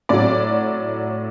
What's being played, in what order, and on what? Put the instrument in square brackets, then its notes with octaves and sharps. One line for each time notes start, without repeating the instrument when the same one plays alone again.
[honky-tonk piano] A2 F#3 D5